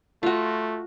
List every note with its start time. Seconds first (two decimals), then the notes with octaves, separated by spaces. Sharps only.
0.23 A3 F4 F#4